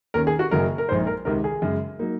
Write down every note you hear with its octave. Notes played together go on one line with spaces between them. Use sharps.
D#2 D#3 A#3 C#4 A#4
G#4
F#4
F#1 F#2 C#3 F#3 A#4
A#4
A#1 A#2 G#3 D#4 C5
A#4
C#2 C3 D#3 A#4
G#4
F#2 C#3 G#3
F#3 A#3 D#4